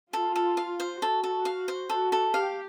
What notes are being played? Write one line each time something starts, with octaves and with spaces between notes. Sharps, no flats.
F4 A4
A4
F5
C5
F#4 A4
A4
F5
C5
F#4 A4
A4
G4 F5